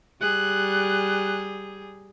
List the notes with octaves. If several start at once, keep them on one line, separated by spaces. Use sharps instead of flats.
G3 G#4 F#6